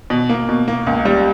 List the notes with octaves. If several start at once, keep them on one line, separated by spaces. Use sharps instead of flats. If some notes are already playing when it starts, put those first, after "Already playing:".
B2
A#3
B2
A#3
C#2
G3